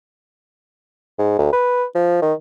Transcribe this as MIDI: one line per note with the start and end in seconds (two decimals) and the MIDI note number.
1.19 1.38 44
1.39 1.48 38
1.53 1.85 71
1.95 2.18 53
2.22 2.33 51